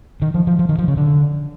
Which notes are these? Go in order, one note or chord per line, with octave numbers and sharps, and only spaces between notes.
D#3
F3
F3
F3
D#3
F3
C#3
D3